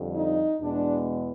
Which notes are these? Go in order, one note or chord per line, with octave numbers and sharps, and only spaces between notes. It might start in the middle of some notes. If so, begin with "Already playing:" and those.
Already playing: F2 D3 G3
D#4
E2 B2 G#3 B3 D4